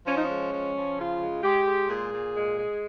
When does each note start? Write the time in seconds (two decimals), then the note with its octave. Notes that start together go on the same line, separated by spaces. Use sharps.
0.07 F3 C#4
0.16 D#4
0.23 C#4
0.29 G#3
0.53 F3
0.75 F3
0.98 C#3 F4
1.20 G#3
1.43 G#3 G4
1.66 G#3
1.89 A#2 G#4
2.12 A#2
2.35 G#3
2.57 G#3